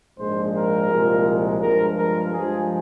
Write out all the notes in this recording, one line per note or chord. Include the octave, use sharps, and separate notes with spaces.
A#1 G#2 F3 G#3 C5
A#4
C2 A#2 F3 G#3
G2 F3 G#3 A#4
A#4
G2 F3 G#3 G#4